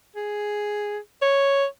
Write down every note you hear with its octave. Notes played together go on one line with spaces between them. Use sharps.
G#4
C#5